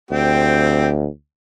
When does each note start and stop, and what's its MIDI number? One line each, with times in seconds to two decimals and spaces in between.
0.11 1.07 38
0.11 0.92 60
0.11 0.92 67